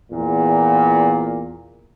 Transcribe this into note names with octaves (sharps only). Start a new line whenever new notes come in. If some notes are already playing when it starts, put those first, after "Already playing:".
E2 A#2